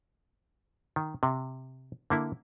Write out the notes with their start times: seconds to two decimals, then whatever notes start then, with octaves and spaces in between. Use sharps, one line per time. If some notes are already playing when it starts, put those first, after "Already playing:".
0.96 D#3
1.23 C3
2.10 D3 A#3 E4